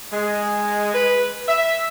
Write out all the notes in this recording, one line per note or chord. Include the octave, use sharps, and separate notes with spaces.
G#3
B4
E5